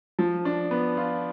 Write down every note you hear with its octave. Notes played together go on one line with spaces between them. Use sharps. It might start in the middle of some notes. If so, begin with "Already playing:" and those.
F3
D4
B3
F4